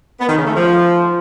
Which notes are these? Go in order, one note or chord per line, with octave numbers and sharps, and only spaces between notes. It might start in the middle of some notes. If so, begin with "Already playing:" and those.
B3
D#3
C#3
A3
F3